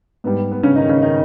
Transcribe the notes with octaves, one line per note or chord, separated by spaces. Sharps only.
G#2 G3 B3
B3
C#3 C#4
D#3 D#4
C#3 C#4
D#3 D#4